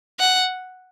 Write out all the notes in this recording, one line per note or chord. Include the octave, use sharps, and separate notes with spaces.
F#5